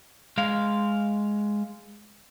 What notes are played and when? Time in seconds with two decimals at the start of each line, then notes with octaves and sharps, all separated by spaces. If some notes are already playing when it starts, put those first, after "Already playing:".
0.38 G#3 F5